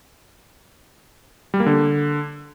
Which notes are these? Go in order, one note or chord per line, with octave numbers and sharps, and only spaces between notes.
G3
A#3
D3